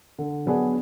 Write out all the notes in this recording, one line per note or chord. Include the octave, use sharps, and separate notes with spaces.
D3
F#3 B3 D4 G#4